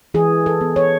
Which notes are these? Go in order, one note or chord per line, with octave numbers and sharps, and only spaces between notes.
E3 G#4
A4
B3
C#5